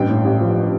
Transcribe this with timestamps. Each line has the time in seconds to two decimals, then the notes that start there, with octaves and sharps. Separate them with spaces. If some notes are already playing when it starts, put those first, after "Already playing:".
Already playing: A1 G2 G5
0.09 A2
0.25 A1
0.41 F3